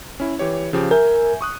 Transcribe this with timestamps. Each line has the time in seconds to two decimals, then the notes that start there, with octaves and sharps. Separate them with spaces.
0.20 C#4 E4
0.39 E3 G4 C#5
0.73 C#3 F3 G4
0.91 A#4 E5 G#5 G6
1.41 C#6 D#6 F#6